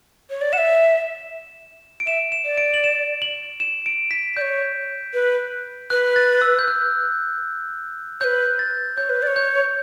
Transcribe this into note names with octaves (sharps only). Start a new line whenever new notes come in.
C#5
D5
F#5 E7
E5
D7
E5 E7
E7
D5
D7
F#7
E7
F#7
E7
D7
B6
C#5 D5 G6
B4
B4 F#6
A6
E6
G6
F#6
B4 C#5 G6
A6
C#5 G6
B4
D5
C#5
G6